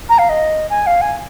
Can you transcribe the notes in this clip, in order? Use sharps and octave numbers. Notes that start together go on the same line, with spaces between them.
A#5
F5
D#5
G#5
F5
G#5